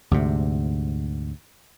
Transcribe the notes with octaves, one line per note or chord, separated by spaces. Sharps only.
D2 G#2 C3